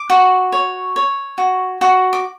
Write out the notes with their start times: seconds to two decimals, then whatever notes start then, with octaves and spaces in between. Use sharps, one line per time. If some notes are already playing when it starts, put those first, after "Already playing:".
Already playing: D6
0.10 F#4
0.52 C#5
0.96 C#5
1.38 F#4
1.81 F#4
2.13 D6